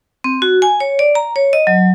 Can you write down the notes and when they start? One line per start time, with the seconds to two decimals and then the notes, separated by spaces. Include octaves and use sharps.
0.24 C4
0.42 F#4
0.62 G#5
0.80 C#5
0.99 D5
1.15 A#5
1.36 C#5
1.53 D#5
1.67 F#3